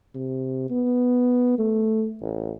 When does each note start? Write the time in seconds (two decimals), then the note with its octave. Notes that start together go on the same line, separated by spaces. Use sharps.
0.15 C3
0.70 B3
1.58 A3
2.21 A1